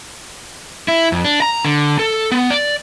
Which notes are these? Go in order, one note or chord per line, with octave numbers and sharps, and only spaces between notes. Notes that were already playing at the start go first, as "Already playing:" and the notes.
E4
F2
D4
A#5
D3
A4
B3
D5